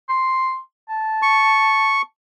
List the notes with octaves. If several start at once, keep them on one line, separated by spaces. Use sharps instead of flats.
C6
A5
C#6